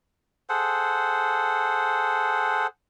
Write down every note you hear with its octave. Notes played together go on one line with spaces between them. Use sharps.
G#4 A4 C5 F#5